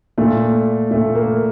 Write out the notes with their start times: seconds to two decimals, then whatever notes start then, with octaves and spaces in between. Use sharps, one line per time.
0.18 A#2 A3
0.91 A#2 A3
1.15 A#3